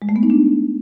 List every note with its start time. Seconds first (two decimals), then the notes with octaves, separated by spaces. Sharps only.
0.02 G#3
0.09 A3
0.16 B3
0.23 D#4
0.30 D4